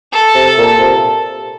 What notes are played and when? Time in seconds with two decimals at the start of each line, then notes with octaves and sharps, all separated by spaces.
0.12 A4
0.35 C3
0.46 A4
0.58 A#2
0.79 C3